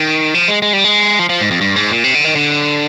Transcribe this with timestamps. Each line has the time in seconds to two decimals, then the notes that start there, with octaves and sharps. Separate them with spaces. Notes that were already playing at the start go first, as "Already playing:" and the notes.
Already playing: D#3
0.34 F3
0.48 G#3
0.62 G#3
0.73 G3
0.84 G#3
1.19 F3
1.29 F3
1.41 G#2
1.51 F2
1.61 G2
1.76 G#2
1.90 A#2
2.04 C3
2.15 D3
2.25 D#3
2.35 D3